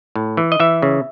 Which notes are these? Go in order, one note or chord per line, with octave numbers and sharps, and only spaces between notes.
A2
E3
D#5
E3 E5
C#3